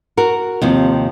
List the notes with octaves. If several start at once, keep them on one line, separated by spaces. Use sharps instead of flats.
F#4 A#4
D#2 C3 F3